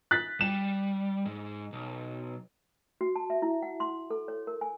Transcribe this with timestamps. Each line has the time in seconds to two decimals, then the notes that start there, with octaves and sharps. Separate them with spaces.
0.11 F#6 A6 B6
0.41 G3 E7
1.26 G#2
1.73 B1
3.01 F#4
3.16 A5
3.30 E5
3.42 E4
3.62 F#5
3.80 C6
4.10 A4
4.28 C#5
4.47 A#4
4.61 G#5